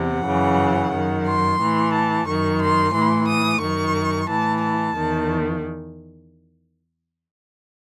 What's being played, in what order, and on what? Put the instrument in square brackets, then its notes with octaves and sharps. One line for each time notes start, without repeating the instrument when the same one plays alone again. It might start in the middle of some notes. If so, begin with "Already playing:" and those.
Already playing: [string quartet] E2 C3 F#5
F#2 C#3 E3
F#2 D#3
C6
A2 E3
A5
F#2 D#3 C#6
C6
A2 E3 C6
D#6
F#2 D#3 C#6
A2 E3 A5
A5
E2 D#3